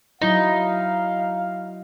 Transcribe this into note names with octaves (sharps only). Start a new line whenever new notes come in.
F#3 D#4 E4 D#5 F5